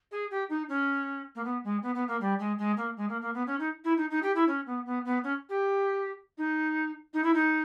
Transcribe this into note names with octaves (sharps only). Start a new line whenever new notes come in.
G#4
G4
D#4
C#4
A#3
B3
G#3
B3
B3
A#3
G3
G#3
G#3
A#3
G#3
A#3
A#3
B3
C#4
D#4
E4
D#4
D#4
G4
E4
C#4
B3
B3
B3
C#4
G4
D#4
D#4
E4
D#4